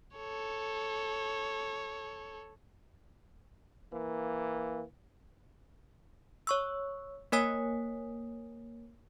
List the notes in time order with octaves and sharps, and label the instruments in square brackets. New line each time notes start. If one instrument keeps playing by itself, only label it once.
[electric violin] A4 C#5
[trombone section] E3 A#3
[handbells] C#5 C#6 E6
A#3 A#4 C#5 G#5 D#6 B6